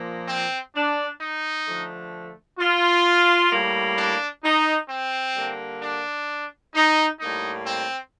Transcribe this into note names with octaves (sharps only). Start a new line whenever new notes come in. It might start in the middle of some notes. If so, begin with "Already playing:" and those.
Already playing: A#2 F3 A#3
C4
D4
D#4
D3 F3 A3
F4
A2 G3 A#3
D4
D#4
C4
D3 G3 A#3
D4
D#4
A2 G3 A#3 D#4
C4